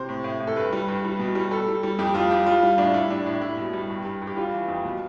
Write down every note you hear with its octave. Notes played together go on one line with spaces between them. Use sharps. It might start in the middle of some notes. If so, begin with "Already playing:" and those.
Already playing: C3 C5
A2
A2
A2
A4
G2 B4
G3
G2
G3
B2
G3
G3 A4
G3
G3
F2 G4
F2 F4
G3 G4
G3 F4
G3
A2 D4
G3 E4
A2 D4
A2 D4
G3 E4
B2
G3
G2
G2
G2
G4
G3 F4
E3
F2
B2